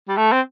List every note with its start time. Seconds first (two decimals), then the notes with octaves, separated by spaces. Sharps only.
0.08 G3
0.17 A3
0.32 C4